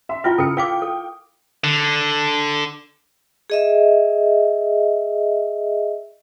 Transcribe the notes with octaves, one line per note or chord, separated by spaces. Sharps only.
E5 C6
E4 F4 E5 F#5 G5 F6
C#3 A4 A#4 C#7
A#4 F5 G5 D6
A4
D3
G#4 D#5 E5